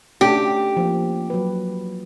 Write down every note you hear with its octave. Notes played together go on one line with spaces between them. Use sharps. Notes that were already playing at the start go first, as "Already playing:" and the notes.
A3 C#4 D4 G4
F3 A#3
F#3 B4